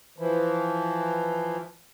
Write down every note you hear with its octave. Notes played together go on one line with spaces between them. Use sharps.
E3 F3